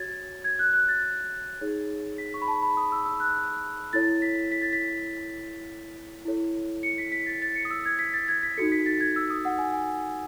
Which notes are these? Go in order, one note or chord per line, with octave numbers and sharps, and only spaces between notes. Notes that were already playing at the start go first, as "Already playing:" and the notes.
Already playing: F#4 C#5 G#6 A6
G#6
F#6
F#6
A6
D#4 G#4 C#5
B6
C#6
B5
A5
B5
D#6
E6
E6
F#6
E4 A4 C#5 A6
B6
B6
A6
B6
E4 A4 C#5
C#7
B6
B6
A6
A6
C#7
D#6
E6
G#6
B6
A6
G#6
B6
D#4 F#4 A4 C#7
B6
A6
G#6
E6
D#6
F#5
G#5
G#5